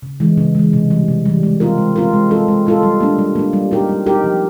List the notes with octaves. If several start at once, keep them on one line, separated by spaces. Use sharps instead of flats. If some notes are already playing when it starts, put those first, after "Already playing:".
C#3
E3 G#3
C#3
E3 G#3
C3
E3 G3
C3
E3 G3
G#3
C4 F4 A#4
G#3
C4 F4 A#4
G#3
C4 F4 A4
G#3
C4 F4 A4
G3
A#3 D4
G3
A#3 D4
G3
C4 D#4 G4 A#4
G3
C4 D#4 G4 A#4
F3